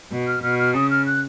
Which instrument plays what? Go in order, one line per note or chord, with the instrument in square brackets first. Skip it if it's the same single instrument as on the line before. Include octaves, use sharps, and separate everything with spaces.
[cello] B2
[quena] F6
[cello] B2 [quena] F6
[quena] F6
[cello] C#3 [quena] D#6
[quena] F6
F#6